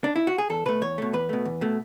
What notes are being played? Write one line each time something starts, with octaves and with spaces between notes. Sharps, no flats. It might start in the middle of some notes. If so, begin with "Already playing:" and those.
D4
E4
F#4
G#4
E2 A4
B2 A3 B4
E2 C#5
B2 A3
E2 B4
B2 A3
E2
B2 A3